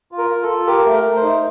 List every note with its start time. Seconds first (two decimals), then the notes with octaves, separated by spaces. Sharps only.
0.12 F4
0.18 A#4
0.30 F4
0.43 A4
0.49 F4
0.67 G4 A#4
0.86 A3
0.92 A#4
1.04 A3
1.16 C5
1.23 D#4